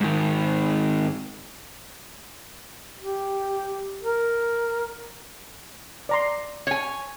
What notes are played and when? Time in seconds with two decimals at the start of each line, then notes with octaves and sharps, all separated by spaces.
0.01 G#2 D#3
3.00 G4
4.02 A#4
6.09 D5 A#5 C6
6.67 C#5 G#5